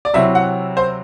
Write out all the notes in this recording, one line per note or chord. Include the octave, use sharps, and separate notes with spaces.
D5
C3 F#3 C4 E4 E5
F#5
C5